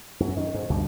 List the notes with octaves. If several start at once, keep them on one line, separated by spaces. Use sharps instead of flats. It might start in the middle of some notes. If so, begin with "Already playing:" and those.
F#2
D#3
G#2
D2 G2 B2